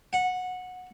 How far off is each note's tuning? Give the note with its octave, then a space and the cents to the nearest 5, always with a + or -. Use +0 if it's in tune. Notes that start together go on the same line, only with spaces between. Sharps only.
F#5 -15